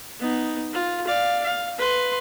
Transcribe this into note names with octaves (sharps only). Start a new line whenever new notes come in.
B3 D#4
F4
D5 F5
F5
B4 C6